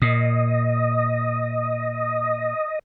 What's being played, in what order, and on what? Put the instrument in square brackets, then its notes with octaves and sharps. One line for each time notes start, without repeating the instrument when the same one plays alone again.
[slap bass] A#2 [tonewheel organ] D#5